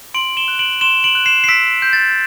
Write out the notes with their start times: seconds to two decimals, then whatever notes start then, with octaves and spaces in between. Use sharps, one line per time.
0.14 C6 D7 F#7
0.37 E7 G7
0.48 F#6
0.59 D7 F#7
0.81 C6 E7 G7
1.04 D7 F#7
1.15 F#6
1.26 C7 E7
1.44 C7
1.48 E6 B6 D7
1.82 G6
1.93 A6